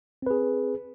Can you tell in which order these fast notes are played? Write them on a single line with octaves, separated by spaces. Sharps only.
C4 B4 G#4